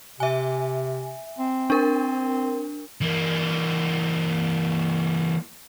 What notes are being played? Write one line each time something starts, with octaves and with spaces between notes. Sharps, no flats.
C3 E5 G#5
C4
D4 A#4
E3 A#3